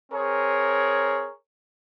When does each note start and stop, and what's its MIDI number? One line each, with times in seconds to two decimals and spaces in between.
0.12 1.30 60
0.12 1.30 68
0.12 1.30 70
0.12 1.30 73